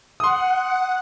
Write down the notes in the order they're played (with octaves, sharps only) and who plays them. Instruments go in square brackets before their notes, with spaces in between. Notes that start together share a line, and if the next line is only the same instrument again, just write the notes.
[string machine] F#5 [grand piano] C6 D#6